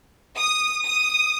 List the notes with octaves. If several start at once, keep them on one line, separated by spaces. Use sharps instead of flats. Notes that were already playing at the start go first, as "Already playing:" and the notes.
D#6
D#6